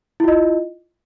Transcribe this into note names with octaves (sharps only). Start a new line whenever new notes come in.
E4 F4 D#5